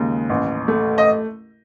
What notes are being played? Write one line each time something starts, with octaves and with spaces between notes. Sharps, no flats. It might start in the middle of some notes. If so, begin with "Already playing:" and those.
Already playing: D#2 C#3 G#3
A1
A3
D#5